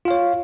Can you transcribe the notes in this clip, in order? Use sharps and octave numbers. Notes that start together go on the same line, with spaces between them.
F4 C#5 F5